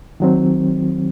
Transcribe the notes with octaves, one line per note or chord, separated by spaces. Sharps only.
D#3 F#3 C4